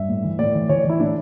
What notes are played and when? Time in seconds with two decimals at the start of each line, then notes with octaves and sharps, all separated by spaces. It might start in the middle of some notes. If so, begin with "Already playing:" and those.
Already playing: G2 E5
0.09 A2
0.24 E3
0.39 A2 D5
0.55 E3
0.69 E3 C#5
0.85 E3 E4
1.00 A2 D4